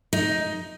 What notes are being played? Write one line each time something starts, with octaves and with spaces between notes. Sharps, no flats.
D#4